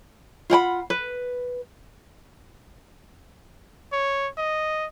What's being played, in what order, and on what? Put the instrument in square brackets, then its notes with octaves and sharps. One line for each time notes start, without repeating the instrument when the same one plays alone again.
[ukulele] F4 F#5 G5 B5
B4
[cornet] C#5
D#5